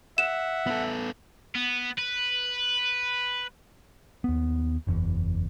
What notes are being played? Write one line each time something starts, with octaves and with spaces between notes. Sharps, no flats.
E5 F#5 E7
B3 A4
B3
B4
D#2 B3
F#1 E2